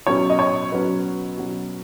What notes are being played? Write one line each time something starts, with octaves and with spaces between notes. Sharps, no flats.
B2 F#3 C#4 C#5
D#5
C#5
B2 F#3 C#4 B4
B2 F#3 C#4